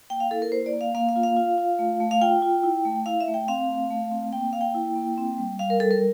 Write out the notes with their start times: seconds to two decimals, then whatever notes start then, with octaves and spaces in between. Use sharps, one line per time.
0.10 A#3 G5
0.20 F5
0.31 E4 A4
0.42 A#4
0.52 A#3 C5
0.66 D5
0.73 A#3
0.81 F5
0.95 A#3 F5
1.09 F5
1.16 F4
1.23 F5
1.37 F4
1.58 F4
1.79 A3
2.00 A3
2.11 F5
2.21 F4 G5
2.42 F4
2.64 E4
2.85 A3
3.06 E4 F5
3.20 E5
3.28 A3
3.34 G5
3.48 C4 F5
3.69 A3
3.90 A3
4.11 C4
4.32 A#3 G5
4.53 A#3 F5
4.61 G5
4.75 E4
4.96 A#3
5.17 C4
5.38 G3
5.59 G3 F5
5.70 A#4
5.80 G3 A4
5.91 A#4